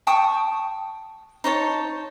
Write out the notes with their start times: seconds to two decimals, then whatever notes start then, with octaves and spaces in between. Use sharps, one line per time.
0.07 G5 A5 C#6 D#6
1.44 D#4 C5 C#5 A5